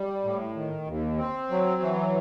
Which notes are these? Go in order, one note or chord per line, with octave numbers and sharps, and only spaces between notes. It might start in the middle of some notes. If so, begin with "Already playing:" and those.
Already playing: G3
A2
D#3
D#2
C4
F#3
E3